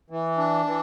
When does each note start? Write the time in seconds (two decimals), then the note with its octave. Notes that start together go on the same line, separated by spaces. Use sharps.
0.10 E3
0.38 D4
0.66 E3